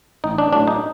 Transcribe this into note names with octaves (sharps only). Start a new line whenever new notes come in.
A1 D#4
D4
A2 F#3 A3 D4
D#4